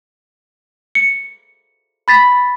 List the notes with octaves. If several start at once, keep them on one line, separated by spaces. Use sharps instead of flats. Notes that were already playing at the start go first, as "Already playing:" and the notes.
C#7
B5 A6 B6